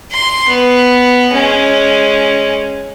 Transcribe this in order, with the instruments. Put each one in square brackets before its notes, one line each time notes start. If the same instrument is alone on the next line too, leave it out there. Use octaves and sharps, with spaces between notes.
[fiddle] C6
B3
G#3 C#4